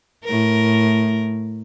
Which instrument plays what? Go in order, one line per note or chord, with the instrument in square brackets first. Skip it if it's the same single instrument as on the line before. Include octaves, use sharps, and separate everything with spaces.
[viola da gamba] A2 A#4